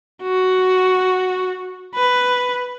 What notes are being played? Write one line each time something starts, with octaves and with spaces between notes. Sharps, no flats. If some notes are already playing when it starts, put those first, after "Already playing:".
F#4
B4